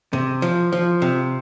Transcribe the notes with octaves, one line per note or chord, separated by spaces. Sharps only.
C3
F3
F3
C3